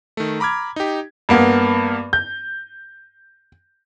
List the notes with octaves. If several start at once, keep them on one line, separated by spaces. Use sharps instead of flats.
D#3 A3
A#5 B5 D6 F6 G#6
D#4 G4
G2 A#3 B3
G6